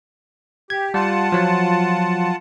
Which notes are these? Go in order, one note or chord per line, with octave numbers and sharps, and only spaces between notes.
G4 G#6
G3 F4 F#5 A5
F3 F#3